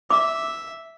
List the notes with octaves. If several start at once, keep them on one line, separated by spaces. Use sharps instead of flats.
E5 D6